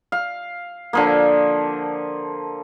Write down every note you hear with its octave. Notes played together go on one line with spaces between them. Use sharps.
F5
D3 F3 A#3